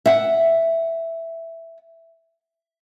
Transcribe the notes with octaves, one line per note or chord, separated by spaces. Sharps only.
E5 F#5